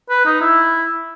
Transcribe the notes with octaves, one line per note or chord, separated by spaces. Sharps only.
B4
D#4
E4